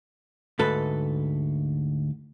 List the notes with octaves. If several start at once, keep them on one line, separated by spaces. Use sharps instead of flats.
D2 G#2 A4 B4